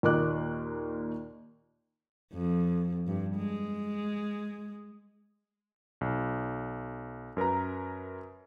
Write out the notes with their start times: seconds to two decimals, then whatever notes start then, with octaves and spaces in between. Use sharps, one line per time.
0.03 D#2 A#2 A#3 D#5 D6 F#6
2.33 F2
3.07 G2
3.36 G#3
6.01 B1
7.37 F#2 A#4 B4 A#5